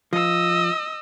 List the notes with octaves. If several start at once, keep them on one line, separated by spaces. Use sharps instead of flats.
F3 D#5 E6